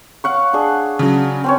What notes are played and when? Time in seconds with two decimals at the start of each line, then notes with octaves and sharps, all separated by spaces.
0.24 F5 F#5 C#6
0.53 D4 G#4
0.99 C#3 F#3
1.44 C4 C#4 C#5